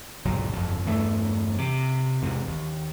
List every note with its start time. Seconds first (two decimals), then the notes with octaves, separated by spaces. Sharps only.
0.25 G1 C#2 A#2 F#3
0.54 G1 F2
0.85 E2 G2 E3 A3
1.59 C3
2.22 E2 G#2 C3
2.47 D#2